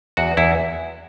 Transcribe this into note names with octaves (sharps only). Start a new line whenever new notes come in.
E2 F#4
E2 E4